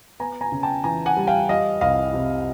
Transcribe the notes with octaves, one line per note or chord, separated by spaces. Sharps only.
B3 G#5 A#5
G#5 A#5
C#3
G5 A5
E3 G#5 A#5
F#5 G#5
G3
F5 G5
G3 D#5 F5
C2 D#5 F5
C3